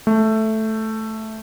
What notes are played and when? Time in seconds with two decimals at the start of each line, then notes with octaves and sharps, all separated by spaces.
0.07 A3